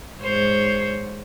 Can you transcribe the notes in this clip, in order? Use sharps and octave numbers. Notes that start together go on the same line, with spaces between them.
G#2 C5 C#5